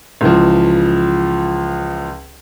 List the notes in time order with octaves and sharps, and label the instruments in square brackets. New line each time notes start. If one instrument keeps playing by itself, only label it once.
[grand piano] C#2 E3 F3